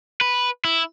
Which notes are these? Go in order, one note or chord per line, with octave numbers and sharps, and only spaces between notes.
B4
E4